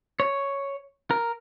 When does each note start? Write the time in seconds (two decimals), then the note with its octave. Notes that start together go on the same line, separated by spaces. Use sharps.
0.20 C#5
1.11 A#4